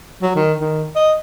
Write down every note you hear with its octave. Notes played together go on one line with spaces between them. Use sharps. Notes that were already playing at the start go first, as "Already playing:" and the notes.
F#3
D#3
D#3
D#5